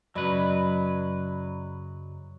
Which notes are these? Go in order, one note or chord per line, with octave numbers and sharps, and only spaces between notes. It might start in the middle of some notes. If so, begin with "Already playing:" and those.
F#2 C#3 F#3 B4 D5 D#5 B5